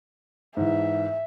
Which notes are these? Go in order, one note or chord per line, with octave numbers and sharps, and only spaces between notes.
G#2 E3 E5